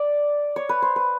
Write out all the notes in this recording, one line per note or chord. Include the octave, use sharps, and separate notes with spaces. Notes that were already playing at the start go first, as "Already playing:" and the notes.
Already playing: D5
C#5
B4
C5
B4